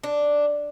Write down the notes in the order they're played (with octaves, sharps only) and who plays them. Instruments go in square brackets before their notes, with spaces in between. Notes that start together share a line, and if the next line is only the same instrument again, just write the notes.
[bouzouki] D4